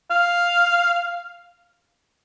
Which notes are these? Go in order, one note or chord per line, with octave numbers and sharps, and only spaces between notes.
F5